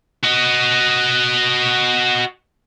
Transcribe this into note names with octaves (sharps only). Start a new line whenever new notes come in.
F#4 D#5